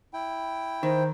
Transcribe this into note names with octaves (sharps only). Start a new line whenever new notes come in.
E4 G5
D#3 C5